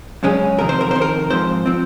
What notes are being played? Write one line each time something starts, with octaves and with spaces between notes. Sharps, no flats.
F#2 C#3 G#3 C#4
F2 C3 D#3 A#4
C5
A#4
F2 C3 D#3 C5
A#4
G#2 F3 C4 C5
F3 C4